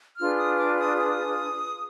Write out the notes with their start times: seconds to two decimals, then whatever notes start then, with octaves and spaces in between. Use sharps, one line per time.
0.18 D4 F4 G#4 B4 F6
0.37 D#6
0.58 D6
0.78 D#6
0.99 D#6